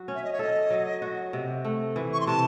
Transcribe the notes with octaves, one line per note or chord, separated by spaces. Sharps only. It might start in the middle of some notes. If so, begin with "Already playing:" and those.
Already playing: F#3 F#4
C#4
E5
D#5
C#5
A4 D#5
F#3
F#4
C3
A3
E3
C#6
C6
C3 A5